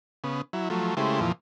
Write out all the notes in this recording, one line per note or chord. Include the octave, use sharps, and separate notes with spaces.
C#3 B3
F#3 E4
F3 F#3 A3
C#3 G#3 A3 E4 G4 C5
F2 A#2 E3 F3